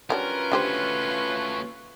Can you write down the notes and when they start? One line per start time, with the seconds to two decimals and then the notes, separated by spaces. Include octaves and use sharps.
0.10 F#3 G3 C#4 D4 F4 A#4 B4
0.52 A3 D4 F#4 G4 C5